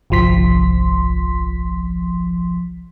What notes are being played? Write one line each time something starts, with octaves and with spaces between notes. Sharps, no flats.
G1 C2 F3 C6 B6